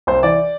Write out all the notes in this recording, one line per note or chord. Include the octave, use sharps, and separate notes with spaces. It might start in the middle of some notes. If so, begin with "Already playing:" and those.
C2 C5
E3 D5